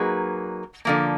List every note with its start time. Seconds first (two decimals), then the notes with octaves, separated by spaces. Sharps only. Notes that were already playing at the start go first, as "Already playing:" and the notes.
Already playing: F#3 A#3 D#4 G#4 B4
0.85 D3 F3 A#3